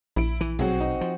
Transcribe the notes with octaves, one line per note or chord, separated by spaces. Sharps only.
A#1 E4 D7
E3
B1 F#3 C4 F#4 G#4
D#4
F3